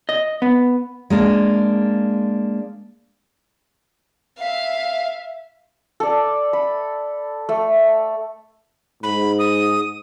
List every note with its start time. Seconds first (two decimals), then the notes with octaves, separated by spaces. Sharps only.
0.09 D#5
0.42 B3
1.10 G#3 A#3 D4
4.38 E5 F5
6.00 A4 D5
6.53 B5
7.49 A3
9.03 G#2 B5
9.39 D#6